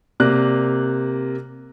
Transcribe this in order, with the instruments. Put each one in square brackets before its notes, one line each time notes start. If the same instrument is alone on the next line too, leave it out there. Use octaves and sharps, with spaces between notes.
[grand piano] C3 A#3 D5 F#6